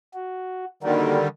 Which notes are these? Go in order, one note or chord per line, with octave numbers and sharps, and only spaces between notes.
F#4
D3 D#3 G3 A#3 F#4 A#4